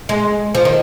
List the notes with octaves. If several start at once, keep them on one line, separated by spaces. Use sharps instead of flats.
G#3
F3
D#3